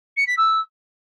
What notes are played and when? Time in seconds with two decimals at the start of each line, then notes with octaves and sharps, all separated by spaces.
0.17 C#7
0.27 B6
0.37 E6